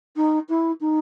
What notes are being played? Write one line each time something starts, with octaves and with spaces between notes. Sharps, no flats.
D#4
E4
D#4